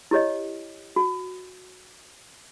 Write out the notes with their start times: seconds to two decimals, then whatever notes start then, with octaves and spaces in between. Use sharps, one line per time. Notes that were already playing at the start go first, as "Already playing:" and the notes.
0.11 E4 G4 C#5 D#5
0.96 F#4